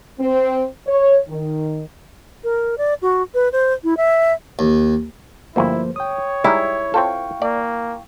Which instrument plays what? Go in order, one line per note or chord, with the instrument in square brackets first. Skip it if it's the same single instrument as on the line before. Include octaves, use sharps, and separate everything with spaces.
[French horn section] C4
C#5
D#3
[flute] A#4
D5
F#4
B4
C5
E4
E5
[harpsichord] D#2
[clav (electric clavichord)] G1 D2 [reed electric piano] F3 A#3 C5 [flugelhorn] E4
[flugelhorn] C#5 [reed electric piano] G5 D#6
[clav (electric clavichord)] G3 G#3 D#4 [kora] E4
[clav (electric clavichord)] C4 F4 A4 [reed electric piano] F5 G5 C#6
[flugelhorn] A#3 [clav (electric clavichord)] D5